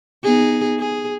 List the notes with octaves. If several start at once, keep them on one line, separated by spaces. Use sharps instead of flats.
B3 D#4 G#4
G#4